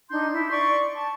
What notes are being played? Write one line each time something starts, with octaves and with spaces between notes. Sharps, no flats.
D4 D#4 C6 G6
E4
D5 C6 C#6
A5